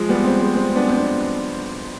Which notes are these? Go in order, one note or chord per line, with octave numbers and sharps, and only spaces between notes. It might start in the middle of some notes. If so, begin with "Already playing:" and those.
Already playing: F3 G#3
G3 B3
G#3 C4
G#3 C4
G#3 C4
B3 D4
C4
B3 D4